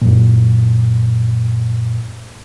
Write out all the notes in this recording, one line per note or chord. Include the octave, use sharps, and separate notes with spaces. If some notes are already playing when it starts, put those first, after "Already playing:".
F#2 A#2